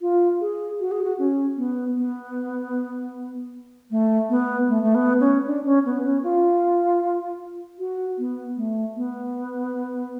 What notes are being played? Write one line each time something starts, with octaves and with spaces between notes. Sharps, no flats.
F4
G#4
F#4
G#4
F#4
C#4
B3
B3
A3
B3
A3
A3
B3
C#4
D4
C#4
B3
C#4
F4
F#4
B3
A3
B3